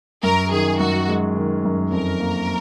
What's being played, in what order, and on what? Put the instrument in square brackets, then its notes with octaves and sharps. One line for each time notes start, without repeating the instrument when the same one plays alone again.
[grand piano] F#2 [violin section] A#4
[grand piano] D#3 [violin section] G#4
[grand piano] F#2 [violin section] F#4
[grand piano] G#3
D#3
F#2
[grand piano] F2 [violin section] A#4
[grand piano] A#3